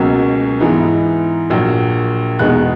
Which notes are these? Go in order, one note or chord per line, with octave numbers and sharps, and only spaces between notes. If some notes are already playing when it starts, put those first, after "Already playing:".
Already playing: C#2 B2 F#3 A#3 C#4
G#2 E3 B3 D#4
A#1 A#2 F#3
E2 B2 G#3 B3 D#4 F#6